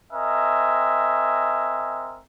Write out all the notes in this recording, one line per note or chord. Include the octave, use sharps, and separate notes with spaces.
C4 A#4 D#5 E5 G#5